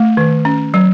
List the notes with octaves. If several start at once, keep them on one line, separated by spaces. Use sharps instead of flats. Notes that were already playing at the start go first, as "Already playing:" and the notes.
Already playing: A3
D#3
C#4
F#3